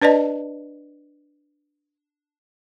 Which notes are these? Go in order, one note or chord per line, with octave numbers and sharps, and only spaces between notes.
D4 B4 D5 D#5 A5